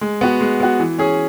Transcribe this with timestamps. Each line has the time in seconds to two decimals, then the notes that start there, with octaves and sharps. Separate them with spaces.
0.01 G#3
0.21 B3 F#4
0.41 G#3
0.60 B3 F#4
0.80 E3
0.99 C#4 G#4